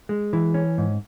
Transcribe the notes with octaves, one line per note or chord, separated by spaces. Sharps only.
G#3
E3
C#4
G#2